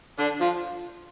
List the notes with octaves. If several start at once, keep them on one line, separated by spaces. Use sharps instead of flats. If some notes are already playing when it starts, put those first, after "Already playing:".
D3 D4
F3 F4